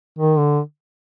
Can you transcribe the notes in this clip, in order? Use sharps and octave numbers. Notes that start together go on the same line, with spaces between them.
D#3
D3